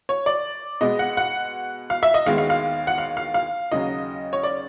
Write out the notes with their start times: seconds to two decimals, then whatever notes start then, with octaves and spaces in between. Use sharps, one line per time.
0.09 C#5
0.26 D5
0.81 B2 G#3 B3 D#5
0.99 F#5
1.17 F#5
1.90 F5
2.03 E5
2.14 D#5
2.26 D#2 D#3 G#3 B3 F5
2.38 F5
2.50 F5
2.87 F#5
2.98 F5
3.17 F5
3.34 F5
3.72 D#2 C#3 F#3 D#5
4.33 C#5
4.43 D5